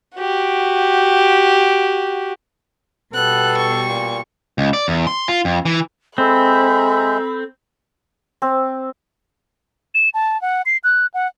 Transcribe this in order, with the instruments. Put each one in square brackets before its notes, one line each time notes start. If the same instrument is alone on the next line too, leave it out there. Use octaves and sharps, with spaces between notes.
[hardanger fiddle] F#4 G4
[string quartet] B2 G3 [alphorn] B3 [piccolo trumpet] A4 [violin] F#6
[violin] C#6
[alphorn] A#2
[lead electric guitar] C#2
D5
E2
C6
F4
F2
E3
[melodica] G#3 E5 [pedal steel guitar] C4 [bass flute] A4 [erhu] B5
[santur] C4
[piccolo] E7
A5
F#5
C7
F#6
F#5